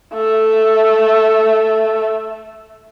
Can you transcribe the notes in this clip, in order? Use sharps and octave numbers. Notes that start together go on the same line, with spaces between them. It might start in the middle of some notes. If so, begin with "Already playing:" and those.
A3 E5